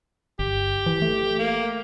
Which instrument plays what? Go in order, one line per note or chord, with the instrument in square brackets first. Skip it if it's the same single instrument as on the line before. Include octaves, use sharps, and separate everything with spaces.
[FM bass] G1 [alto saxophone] G4
[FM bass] E3
A3
[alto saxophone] A#3